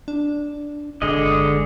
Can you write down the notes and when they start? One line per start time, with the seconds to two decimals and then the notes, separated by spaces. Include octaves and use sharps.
0.08 D4
1.02 G1 D3 G#3 D#5